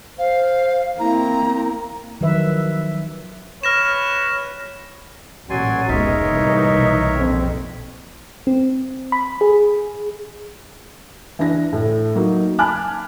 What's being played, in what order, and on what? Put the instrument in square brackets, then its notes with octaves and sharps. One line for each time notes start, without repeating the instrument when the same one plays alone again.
[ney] C5 [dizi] F5
[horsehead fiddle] A#3 C4 [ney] E4 [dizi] A#5
[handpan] D#3 F3 F#3 B4 E5
[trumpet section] B4 C#5 [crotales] F6 A#6 E7
[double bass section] A1 A#2 [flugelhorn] F#3 [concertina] D5 G#5 C6
[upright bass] F1 C#2 [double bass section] G#3 B3 [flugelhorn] D#4 [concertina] A#4 C#5 E5
[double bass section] C2 E3 A#3 [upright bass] A2
[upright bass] B1 B2
[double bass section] A#1 F2 C4
[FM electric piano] C4
B5
G#4
[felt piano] E3 D4 A#6
A2
F#3 A#3 D#4
G#5 A5 B5 D6 F6 F#6